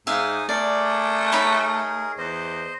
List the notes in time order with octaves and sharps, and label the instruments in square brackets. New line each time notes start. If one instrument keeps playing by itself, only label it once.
[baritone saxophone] G#2 [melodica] D#4 G#5 D#6 [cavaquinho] E5 F5
[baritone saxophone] A3 [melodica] G#4 A#4 [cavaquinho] D5
[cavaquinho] D#4 C#5 B5
[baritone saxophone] E2 [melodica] C5 D#5